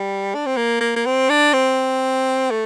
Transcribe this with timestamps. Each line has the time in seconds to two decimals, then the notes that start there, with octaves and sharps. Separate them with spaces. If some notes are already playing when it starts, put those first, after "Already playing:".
Already playing: G3
0.35 D4
0.46 C4
0.57 A#3
0.81 A#3
0.96 A#3
1.06 C4
1.29 D4
1.53 C4
2.51 A3